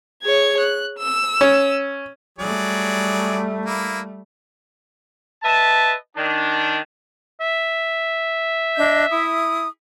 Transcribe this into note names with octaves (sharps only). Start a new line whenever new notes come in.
G#4 C#5 G#6
F#6
E6
C#4
F#3 G3 A3 G#4 D5
A#3 E4
B4 D#5 E5 A5
D#3 D4
E5
D4 D#5 G6
E4 D#6